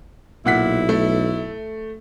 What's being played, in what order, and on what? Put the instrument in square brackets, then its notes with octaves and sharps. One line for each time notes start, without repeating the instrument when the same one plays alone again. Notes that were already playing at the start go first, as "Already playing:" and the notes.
[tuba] B1 [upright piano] A#2 F#5 B6 [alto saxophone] E4
[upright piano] A3